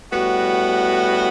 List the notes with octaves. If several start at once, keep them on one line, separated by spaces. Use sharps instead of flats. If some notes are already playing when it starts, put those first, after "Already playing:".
A2 G3 B3 F#4